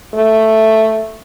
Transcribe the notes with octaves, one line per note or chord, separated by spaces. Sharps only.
A3